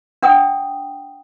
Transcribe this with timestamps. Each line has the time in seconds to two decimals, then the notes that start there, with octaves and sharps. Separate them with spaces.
0.23 D4 F#5 G5 D#6